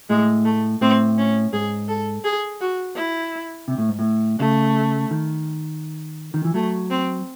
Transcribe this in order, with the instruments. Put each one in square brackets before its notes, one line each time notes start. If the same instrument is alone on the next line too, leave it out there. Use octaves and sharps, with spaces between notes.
[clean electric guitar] A2 [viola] G#3
[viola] A3
[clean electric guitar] A2 [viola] C4
[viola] C#4
[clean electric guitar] G#2 [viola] G#4
[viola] A4
G#4
F#4
E4
[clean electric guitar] C3
A2
G#2
A2
[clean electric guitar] C#3 [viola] A3
[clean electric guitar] D#3
D#3
E3
[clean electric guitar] F#3 [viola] A3
[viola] C4